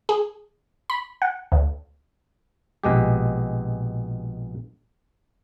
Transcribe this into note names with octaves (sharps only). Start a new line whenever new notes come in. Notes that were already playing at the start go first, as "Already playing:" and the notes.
G#4
B5
F#5
D2
A#1 B2 G#3 G4